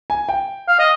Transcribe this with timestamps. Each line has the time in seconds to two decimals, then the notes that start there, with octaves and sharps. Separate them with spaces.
0.10 G#5
0.29 G5
0.68 F5
0.79 D#5